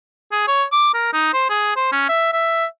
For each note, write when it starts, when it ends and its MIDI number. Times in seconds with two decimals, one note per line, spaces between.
0.32 0.46 68
0.48 0.64 73
0.72 0.90 86
0.94 1.13 70
1.13 1.32 63
1.33 1.49 72
1.50 1.74 68
1.76 1.91 72
1.92 2.05 61
2.09 2.32 76
2.33 2.65 76